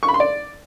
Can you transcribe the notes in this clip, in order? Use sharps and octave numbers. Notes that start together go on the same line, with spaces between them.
C#6
B5
C6
D5